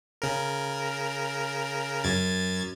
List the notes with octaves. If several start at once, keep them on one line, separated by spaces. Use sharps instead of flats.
C#3 A#4
F#2 G#6 A6